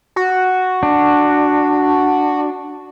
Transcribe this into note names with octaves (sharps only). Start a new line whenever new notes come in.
F#4
D4